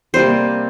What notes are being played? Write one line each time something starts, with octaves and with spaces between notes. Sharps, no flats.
C3 G3 A#3 C5